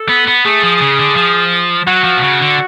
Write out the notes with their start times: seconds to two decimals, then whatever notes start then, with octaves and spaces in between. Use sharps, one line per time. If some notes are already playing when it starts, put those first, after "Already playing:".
Already playing: A4
0.09 B3
0.28 B3
0.45 A3 G#4
0.63 F3
0.81 C#3
0.99 D3
1.16 F3
1.87 F#3 F#4
2.04 F3
2.18 B2
2.23 C#3
2.41 D3